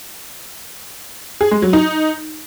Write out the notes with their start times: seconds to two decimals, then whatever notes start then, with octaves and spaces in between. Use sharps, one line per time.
1.41 G#4
1.51 G#3
1.62 F#3
1.73 D#4